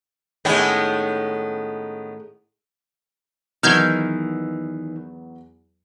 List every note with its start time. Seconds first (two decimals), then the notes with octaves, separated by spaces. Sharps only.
0.45 A2 D#3 G#3 B3 C#4
3.63 E2 D#3 E3 F#3 B3 F6 G6 G#6